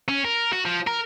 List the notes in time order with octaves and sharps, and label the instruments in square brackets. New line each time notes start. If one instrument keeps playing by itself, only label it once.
[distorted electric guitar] C#4
A#4
F#4
F3
A#4